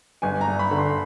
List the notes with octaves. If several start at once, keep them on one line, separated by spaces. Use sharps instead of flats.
G1 G#5
A#5
G2
B5
D3
C6